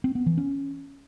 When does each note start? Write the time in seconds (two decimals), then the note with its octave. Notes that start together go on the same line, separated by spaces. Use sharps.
0.04 C4
0.15 B3
0.26 E3
0.38 C#4